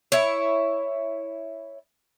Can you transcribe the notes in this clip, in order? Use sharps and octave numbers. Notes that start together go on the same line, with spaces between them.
E4 C#5